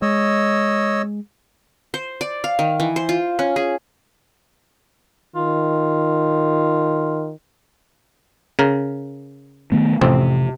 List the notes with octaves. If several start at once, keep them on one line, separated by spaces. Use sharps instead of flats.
G#3 C#5 D#5 E6
C5
D5
F5
D#3
E3
C5
F4
C#4
G#4
D#3 F4
C#3 A#4
D#3 A3 B3
A1 F2 C3 C4